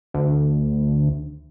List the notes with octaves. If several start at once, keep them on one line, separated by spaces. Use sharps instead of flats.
D2